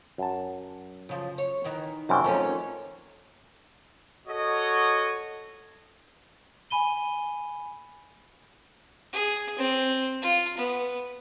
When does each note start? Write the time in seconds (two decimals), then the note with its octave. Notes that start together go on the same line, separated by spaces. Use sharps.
0.18 F#2 A5
1.09 C#3 F3
1.38 C#5
1.64 D#3 E3
2.09 F#2 C3 G3 E5 G#5 C#6
2.24 F2 D#3 A3 C#4
4.28 F#4 A4 C#5 D#5
6.70 G#5 B5 D#7 G7
9.13 G#4
9.58 C4
10.22 F4
10.57 B3